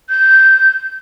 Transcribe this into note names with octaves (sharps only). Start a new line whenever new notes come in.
G6